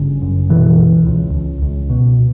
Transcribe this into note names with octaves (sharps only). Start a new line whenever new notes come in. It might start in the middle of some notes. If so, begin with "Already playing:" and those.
Already playing: G1 C#3
F#2
B2 E3
C#2
C#2
C#2
C#2
B2